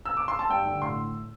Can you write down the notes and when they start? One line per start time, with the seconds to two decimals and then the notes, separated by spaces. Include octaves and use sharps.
0.05 E6
0.17 D6
0.28 C6
0.39 A5
0.49 G2 G5
0.65 D3
0.81 A2 C6